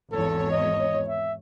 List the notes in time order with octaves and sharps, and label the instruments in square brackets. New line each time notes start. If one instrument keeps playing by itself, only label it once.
[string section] G#1 E2 C#5 [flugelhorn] A4
[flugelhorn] D#5
E5